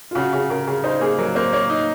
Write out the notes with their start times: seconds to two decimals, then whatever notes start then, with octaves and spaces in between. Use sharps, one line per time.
0.11 F4
0.15 C#3 F#4
0.33 C#3 G#4
0.50 C#3 A#4
0.67 C#3 G#4
0.84 D#4 C5
1.01 A#3 G#4
1.19 F#3 A#4
1.35 A#3 C5
1.53 A#3 C#5
1.70 D#4